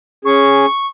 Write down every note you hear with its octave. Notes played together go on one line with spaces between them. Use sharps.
C#4 G#4 C#6